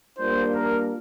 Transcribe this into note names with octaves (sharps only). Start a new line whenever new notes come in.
G3 A#3 D4 F4 C5
A#4